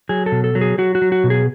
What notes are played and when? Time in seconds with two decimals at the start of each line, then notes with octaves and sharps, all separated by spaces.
0.09 F#3 G#4
0.26 A4
0.32 B2
0.44 A4
0.55 F#3
0.61 G#4
0.78 F#3 F#4
0.95 F#4
1.02 F#3
1.12 F#4
1.24 B2
1.30 G#4